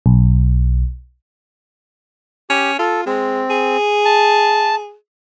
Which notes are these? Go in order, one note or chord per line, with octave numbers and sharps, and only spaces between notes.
B1
C#4 G4
F4 A4
G#3 C4
G#4
A5